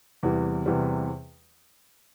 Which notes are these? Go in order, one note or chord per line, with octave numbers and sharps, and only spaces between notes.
E2 C3 E3 G3
E2 C3 E3 G3